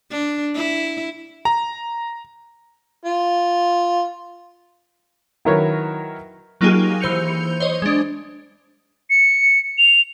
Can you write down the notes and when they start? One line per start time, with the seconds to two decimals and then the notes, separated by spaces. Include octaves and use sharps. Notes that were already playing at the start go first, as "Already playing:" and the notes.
0.11 D4
0.55 E4
1.45 A#5
3.05 F4
5.45 D#3 F#3 E4 A#4 B4 C#5
6.61 F#3 A#3 D#4 F4 G4 G#4
7.00 E3 C5 G6 C#7 F7
7.60 C5 C#5 D#5
7.82 G#3 D4
9.10 C#7
9.78 F7